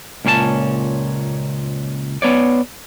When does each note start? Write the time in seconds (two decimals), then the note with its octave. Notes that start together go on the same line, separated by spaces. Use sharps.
0.25 C#2 A#2 C#4 G4 A5
2.22 B3 C#5 D5